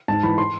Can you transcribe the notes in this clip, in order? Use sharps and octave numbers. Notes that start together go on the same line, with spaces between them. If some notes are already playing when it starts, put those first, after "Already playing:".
G#2 A5
E3 B5
C6